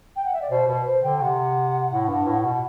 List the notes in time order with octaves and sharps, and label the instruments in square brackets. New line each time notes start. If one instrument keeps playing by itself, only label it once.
[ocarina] G5
F#5
E5
D5
[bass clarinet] B2 [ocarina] C5
[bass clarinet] B2 [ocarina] B4
[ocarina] C5
[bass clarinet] D3 [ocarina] G5
[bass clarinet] C3 [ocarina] F#5
[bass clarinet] A2
G2
A2
B2